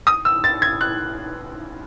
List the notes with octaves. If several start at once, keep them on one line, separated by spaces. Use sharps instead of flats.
D#6
E6
A6
G#6
F#6